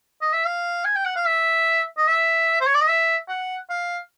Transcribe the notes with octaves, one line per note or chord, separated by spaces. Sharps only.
D#5
E5
F5
G#5
G5
F#5
F5
E5
D#5
E5
C5
C#5
D5
D#5
E5
F#5
F5